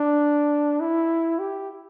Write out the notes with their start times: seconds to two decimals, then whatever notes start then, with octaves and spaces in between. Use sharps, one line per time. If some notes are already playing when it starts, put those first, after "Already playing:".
Already playing: D4
0.80 E4
1.39 G4